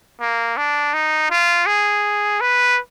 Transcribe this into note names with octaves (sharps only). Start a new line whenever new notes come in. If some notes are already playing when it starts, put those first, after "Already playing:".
A#3
D4
D#4
F4
G#4
B4